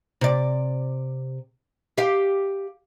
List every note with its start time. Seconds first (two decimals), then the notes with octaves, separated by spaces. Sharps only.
0.21 C3 D5
1.98 G4 F5